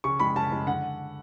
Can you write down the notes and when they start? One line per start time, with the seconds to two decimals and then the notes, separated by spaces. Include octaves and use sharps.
0.04 C#3 C#6
0.20 G#3 B5
0.36 C#3 A5
0.52 G#3
0.67 D3 F#5